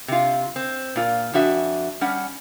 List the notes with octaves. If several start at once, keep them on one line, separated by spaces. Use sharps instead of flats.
C3 F4
C4
A#2 F4
F2 D4 F#4 E5 G#5
G3 C#4 F#5